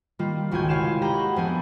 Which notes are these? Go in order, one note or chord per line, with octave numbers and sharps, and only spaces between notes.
D#3 G3 A#3 F4
G#1 C#2 D#3 F#4 G#5 G6
C3 E4 C#5 F5 E7
G4 D#5 G5 A#5 B5
F#4 F#5
F2 F3 B3 D4 G#5 G6